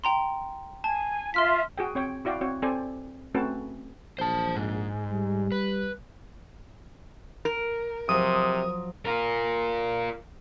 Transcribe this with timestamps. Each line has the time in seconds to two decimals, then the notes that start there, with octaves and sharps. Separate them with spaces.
0.04 G5 A#5 C6
0.84 G#5 A5
1.34 F4 E5 C6 F6 B6
1.78 F#4 G#4 G5
1.95 C4 C#5 G5
2.25 E4 F#4 D5 F5 G5
2.41 C4 F#4 C#5
2.62 C4 A4 C5 D5 G#5
3.34 A3 C4 C#4 F#4 B4 A5
4.19 A#1 C5 A5
4.56 G#2
5.11 G3
5.52 B4
7.45 A#4
8.09 C3 F3 F#3 C5 D#6
9.05 F4 A#4